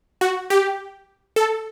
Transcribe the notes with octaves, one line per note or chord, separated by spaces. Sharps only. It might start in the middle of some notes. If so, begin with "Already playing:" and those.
F#4
G4
A4